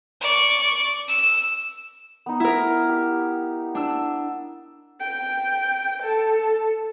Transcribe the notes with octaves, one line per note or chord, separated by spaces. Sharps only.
D5 C#6
E6
B3 D#4
E4 A#4
G4
D4 E6
G5
A4